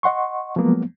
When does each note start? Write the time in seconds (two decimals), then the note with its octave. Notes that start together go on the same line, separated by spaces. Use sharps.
0.03 D#5 F#5 C6 C#6
0.56 F3 F#3 G#3 A#3 B3